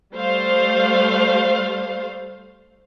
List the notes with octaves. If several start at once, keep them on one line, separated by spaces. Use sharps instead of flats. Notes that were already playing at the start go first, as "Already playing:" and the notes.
G3 A3 C5 F5